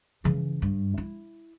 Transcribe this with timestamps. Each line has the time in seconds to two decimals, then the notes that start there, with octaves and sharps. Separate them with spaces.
0.24 C#3 E3
0.62 G2
0.97 E4